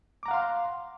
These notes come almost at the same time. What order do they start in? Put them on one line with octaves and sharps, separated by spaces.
D6 A#5 F#5 F5 C6